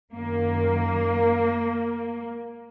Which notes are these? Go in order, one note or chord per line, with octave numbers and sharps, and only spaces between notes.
F#2 D#3 A#3